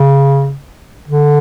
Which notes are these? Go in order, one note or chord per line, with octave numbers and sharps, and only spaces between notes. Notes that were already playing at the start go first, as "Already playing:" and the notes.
Already playing: C#3
D3